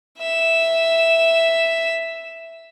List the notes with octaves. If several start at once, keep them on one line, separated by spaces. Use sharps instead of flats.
E5 E7